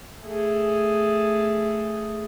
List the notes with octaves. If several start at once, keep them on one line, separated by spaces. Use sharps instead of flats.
A3 G#4